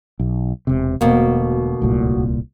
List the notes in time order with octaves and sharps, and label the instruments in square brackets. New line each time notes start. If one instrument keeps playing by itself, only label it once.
[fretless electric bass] B1
E1 C3
[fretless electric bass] E1 [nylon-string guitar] D2 B2 A#3
[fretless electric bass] D1 C2 A#2